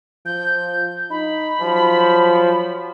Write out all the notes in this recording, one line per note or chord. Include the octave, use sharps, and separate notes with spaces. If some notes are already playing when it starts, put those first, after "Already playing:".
F3 G6
D#4 B5
F3 F#3